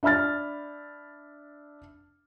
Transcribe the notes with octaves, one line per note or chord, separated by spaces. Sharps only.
D4 E5 B5 F6 A6